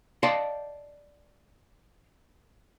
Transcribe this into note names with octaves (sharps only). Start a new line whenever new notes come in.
D5 D#5 F5 G5 A5 C6